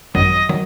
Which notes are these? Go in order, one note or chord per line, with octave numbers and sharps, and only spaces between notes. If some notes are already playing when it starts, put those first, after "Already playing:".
G#1 F#2 D#3 F#3 D#5
D#3 F#3